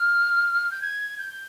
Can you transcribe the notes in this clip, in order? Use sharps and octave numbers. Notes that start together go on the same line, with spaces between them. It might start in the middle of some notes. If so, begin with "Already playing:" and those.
Already playing: F6
G6
G#6
G6